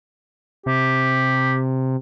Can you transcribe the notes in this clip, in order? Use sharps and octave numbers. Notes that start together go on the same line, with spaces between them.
C3 G4